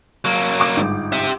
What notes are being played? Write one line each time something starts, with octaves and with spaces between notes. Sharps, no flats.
F#3 A#3
C#6 D6
G1 G#2
G4 E5